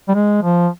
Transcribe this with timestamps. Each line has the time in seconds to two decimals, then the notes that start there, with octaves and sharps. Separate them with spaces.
0.08 G3
0.15 G#3
0.43 F3